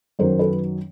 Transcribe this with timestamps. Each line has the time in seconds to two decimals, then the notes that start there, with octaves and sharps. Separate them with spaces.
0.19 F#2 D#3 F#3 A#4 C5
0.39 A4 B4